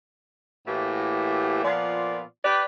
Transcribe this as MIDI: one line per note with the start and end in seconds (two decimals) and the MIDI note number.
0.67 1.64 45
0.67 1.64 52
0.67 1.64 57
0.67 1.64 58
0.67 1.64 66
0.67 1.64 67
1.65 2.22 46
1.65 2.22 53
1.65 2.22 59
1.65 2.22 65
1.65 2.22 74
2.45 2.64 67
2.45 2.64 71
2.45 2.64 74